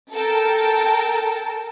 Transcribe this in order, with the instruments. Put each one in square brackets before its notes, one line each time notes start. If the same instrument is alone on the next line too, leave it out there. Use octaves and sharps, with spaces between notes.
[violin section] A4 A#4 G5 A5